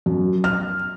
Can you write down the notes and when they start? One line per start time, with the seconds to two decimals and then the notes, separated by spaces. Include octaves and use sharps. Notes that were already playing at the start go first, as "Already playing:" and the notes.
0.06 F#2
0.44 F6